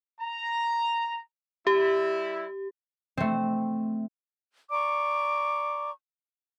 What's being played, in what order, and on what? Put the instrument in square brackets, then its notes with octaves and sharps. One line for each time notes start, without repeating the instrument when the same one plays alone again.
[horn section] A#5
[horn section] G3 E4 [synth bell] G4
[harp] A3 C4
[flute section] D5 A#5 C#6 D6